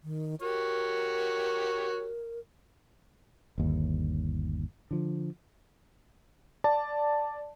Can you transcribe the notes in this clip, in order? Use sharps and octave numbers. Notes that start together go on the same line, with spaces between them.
D#3
F#4 G4 A#4 C#5
G1 D#2
D3 F3
D5 A5